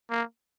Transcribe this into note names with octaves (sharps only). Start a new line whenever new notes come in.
A#3